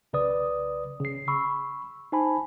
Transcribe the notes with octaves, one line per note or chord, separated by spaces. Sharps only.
B1 C#3 B4 D5 D#6
C#3 C7
B5 C#6 E6
D#4 C5 G#5 A5 B5